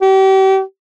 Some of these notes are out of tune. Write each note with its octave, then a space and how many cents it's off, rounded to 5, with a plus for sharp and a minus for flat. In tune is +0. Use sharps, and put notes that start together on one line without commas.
G4 -35